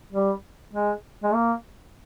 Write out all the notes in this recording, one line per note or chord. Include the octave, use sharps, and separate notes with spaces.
G3
G#3
G#3
A#3